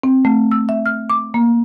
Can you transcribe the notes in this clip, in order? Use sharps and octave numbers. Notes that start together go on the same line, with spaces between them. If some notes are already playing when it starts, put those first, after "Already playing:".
C4
A3
E6
E5
F6
D6
A#3